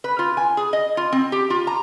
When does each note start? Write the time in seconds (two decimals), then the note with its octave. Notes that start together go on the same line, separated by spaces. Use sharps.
0.04 B4
0.19 F4
0.37 G#5
0.57 G#4
0.73 D#5
0.97 F4
1.12 C4
1.32 G4
1.50 F4
1.67 A#5